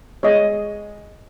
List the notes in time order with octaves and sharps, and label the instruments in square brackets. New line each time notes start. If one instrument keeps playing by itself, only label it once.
[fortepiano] G#3 [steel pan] C#5 D#5